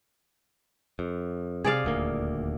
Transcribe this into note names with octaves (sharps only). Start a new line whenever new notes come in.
F2
C3 G#4 D5 F5
D#1 D2 A#3